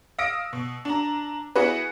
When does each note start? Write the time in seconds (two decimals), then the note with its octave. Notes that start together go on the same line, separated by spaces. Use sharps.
0.18 F5 D#6 E6 A#6 D7
0.53 B2
0.85 D4 A#5
1.56 B3 E4 F#4 G#4 B4